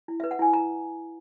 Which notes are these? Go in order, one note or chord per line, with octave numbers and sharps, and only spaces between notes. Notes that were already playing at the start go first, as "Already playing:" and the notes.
E4
E5
B4
F#5
E4 G#5
E4 A#5